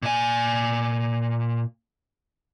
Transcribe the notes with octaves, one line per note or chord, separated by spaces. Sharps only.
A#2 G#5